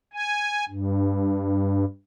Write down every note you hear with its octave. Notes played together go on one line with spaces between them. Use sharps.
G#5
G2